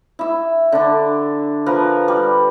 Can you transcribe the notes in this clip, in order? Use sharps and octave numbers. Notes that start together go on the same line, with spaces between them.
E4 E5
D3 D4
F3 A#4 B4
G3 D5